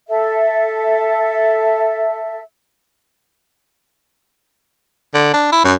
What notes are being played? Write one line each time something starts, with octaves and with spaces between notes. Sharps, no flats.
A4 E5
D3
D4
E4
F#2